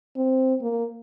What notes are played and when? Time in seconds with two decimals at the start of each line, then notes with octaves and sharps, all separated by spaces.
0.17 C4
0.61 A#3